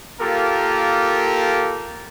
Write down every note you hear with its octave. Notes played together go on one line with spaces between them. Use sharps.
A#3 F4 G4 A4 A#4